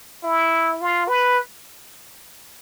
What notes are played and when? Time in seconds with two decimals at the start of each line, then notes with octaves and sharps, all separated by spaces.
0.23 E4
0.81 F4
1.08 B4